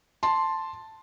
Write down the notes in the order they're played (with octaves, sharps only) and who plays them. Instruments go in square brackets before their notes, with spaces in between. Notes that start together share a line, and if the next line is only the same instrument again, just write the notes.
[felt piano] A5 C6